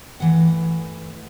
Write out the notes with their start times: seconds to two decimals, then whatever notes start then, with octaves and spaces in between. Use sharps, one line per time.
0.20 G2 E3 A3 F#5